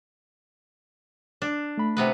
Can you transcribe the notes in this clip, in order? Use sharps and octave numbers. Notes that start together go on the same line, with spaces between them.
D4
A3 B5
C3 B3 B4